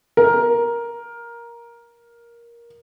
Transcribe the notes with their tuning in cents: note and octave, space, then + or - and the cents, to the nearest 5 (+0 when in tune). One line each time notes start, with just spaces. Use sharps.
A#4 +10